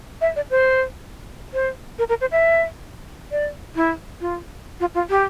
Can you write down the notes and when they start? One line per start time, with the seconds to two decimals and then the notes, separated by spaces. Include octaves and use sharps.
0.21 E5
0.36 D5
0.50 C5
1.54 C5
1.99 A#4
2.09 A#4
2.21 C5
2.32 E5
3.31 D5
3.76 E4
4.21 F4
4.80 F4
4.94 F4
5.10 G4